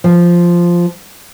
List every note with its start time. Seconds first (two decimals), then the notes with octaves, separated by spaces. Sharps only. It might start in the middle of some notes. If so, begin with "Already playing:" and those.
0.04 F3